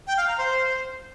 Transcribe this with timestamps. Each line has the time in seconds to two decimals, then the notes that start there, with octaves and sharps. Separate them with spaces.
0.07 G5
0.17 F5
0.28 A#5
0.38 C5